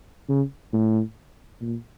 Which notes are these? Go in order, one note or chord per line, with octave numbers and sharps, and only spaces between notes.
C#3
A2
A#2